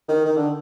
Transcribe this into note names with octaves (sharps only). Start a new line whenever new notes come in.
D#3
D#3
D3